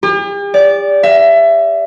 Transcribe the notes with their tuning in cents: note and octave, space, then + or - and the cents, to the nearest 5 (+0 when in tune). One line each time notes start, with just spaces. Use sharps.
G4 +45
D5 -20
E5 +25